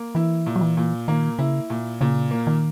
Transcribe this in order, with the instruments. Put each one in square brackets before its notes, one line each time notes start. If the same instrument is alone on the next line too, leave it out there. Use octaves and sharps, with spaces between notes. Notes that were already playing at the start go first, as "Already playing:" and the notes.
Already playing: [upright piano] A#3
[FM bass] E3 [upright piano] E4
[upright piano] A#2
[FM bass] F#3
E3
[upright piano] A#2
[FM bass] D#3 [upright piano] A#3
[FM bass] C#3 [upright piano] E4
[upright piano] A#2
[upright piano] A#2 [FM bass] C#3
[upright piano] A#3
[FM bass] D#3